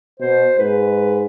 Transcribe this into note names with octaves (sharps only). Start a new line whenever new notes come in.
B2 C5
G#2 B4